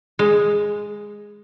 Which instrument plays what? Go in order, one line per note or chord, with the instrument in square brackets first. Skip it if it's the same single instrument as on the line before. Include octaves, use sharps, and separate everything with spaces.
[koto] G#3